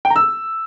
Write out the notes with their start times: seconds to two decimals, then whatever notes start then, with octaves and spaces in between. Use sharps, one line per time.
0.05 G5
0.10 A#5
0.16 E6